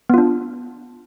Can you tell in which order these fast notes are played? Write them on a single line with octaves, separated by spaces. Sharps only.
B3 F4 D4